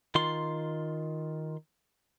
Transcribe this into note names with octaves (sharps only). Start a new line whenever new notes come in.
D#3 F4 C6